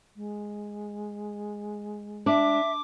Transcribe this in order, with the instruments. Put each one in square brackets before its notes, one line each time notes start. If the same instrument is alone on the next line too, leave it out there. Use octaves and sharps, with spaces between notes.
[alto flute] G#3
[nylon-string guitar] D4 [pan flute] E5 [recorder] D6